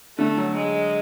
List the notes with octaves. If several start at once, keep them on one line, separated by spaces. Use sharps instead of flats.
D3 A3
F#3
G#3